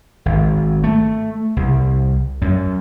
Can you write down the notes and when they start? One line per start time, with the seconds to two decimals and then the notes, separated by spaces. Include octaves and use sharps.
0.26 G#1
0.84 A3
1.56 C2
2.41 F#2